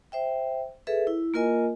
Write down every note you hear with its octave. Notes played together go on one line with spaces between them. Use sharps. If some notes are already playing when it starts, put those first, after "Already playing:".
C5 E5 G5
G#4 A4 B4 E5
E4
A#3 F4 A#4 D#5 G#5